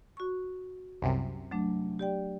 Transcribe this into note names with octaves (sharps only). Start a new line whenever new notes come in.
F#4 C#6
C2 F#2 C3
F#3 A3 D4
G4 D5 G5